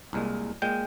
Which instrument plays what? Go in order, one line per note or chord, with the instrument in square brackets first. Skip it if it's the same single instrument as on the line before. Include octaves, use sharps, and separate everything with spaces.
[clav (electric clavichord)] C2 A#2 G#3
A#2 G#3 G5